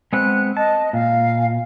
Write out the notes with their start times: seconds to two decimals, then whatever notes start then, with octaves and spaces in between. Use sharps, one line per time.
0.13 G#3 B3 C4 F#6
0.57 D#5 A5
0.93 A#2 F5